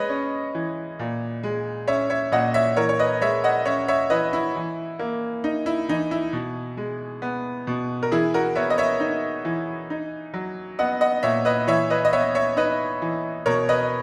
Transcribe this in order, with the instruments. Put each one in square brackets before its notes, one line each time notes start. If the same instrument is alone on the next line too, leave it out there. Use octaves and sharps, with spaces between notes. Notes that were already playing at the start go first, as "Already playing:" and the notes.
Already playing: [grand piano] G#3 B4 C#5 D#5
C#4
E3
A#2
G#3
C#4 C#5 E5
C#5 E5
A#2 D#5 F#5
C#5 E5
E3 A#4 C#5
C#5
B4 D#5
G#3 C#5 E5
D#5 F#5
C#4 C#5 E5
C#5 E5
E3 B4 D#5
E4
E3
A#3
D#4
E4
E3 D#4
E4
B2
G#3
B3
B2
A#4
E3 E4 G#4
F#4 A#4
B3 C#5 E5
D#5
C#5 E5
D#4
E3
D#4
F#3
B3 D#5 F#5
D#5 F#5
A#2 C#5 E5
B4 D#5
E3 C#5 E5
B4 D#5
D#5
B3 C#5 E5
C#5 E5
D#4 B4 D#5
E3
B2 A#4 C#5
B4 D#5